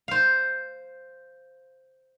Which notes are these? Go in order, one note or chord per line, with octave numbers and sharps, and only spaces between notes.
C5 F5